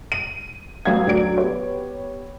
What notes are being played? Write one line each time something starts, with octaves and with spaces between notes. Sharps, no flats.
D#7
A1 F#3 B3 F5 G5 G#6
D2 F#3 D5 D7
B3 G4 C#5